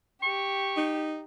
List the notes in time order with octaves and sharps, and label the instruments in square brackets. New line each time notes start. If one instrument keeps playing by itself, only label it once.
[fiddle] G4 [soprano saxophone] C#6
[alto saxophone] D#4